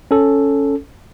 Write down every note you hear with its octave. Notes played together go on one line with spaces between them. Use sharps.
C#4 A4